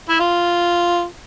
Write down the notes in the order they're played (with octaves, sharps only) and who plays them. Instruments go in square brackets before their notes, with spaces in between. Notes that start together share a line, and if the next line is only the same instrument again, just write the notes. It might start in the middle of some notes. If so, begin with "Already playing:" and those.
[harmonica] E4
F4